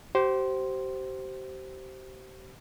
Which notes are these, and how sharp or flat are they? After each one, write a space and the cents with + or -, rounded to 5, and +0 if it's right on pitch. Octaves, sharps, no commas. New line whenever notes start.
G4 -35 C5 +0